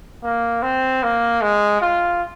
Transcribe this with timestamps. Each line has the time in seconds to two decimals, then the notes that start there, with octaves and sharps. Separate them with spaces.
0.23 A#3
0.62 C4
1.03 A#3
1.42 G#3
1.81 F4